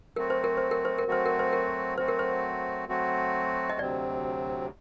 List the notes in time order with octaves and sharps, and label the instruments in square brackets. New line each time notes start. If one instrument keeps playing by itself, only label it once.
[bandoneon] F#3 A3 C4 F#4 [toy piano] A#4
[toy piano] C5
A#4
C5
A#4
C5
A#4
[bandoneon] F#3 A3 C4 F#4 [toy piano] C5
[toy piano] A#4
C5
A#4
[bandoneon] F#3 A3 C4 F#4 [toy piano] C5
[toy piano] A#4
C5
[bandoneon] F#3 A3 C4 F#4
[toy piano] D#5
[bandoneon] D2 C3 F#3 C4 [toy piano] D5